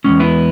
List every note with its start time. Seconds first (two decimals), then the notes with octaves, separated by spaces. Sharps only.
0.04 E2 C#3 G#3 C#4
0.20 B3 E4